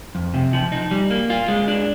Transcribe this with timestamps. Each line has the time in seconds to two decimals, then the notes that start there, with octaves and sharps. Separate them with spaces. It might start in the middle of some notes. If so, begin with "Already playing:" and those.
0.15 F2
0.34 C3
0.53 F3
0.72 D#4
0.91 G3
1.11 A#3
1.30 F4
1.48 G#3
1.68 D4